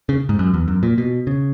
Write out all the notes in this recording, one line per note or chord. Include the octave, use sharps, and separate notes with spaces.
C#3
G#2
F#2
E2
F#2
A#2
B2
C#3